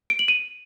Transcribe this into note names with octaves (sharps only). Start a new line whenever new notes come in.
D7
F#7
D#7